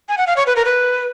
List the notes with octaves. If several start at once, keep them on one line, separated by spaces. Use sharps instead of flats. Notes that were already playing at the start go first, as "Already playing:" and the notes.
G#5
F#5
F5
C#5
B4
A#4
B4